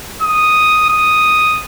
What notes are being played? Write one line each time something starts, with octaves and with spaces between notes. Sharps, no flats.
D#6
D#6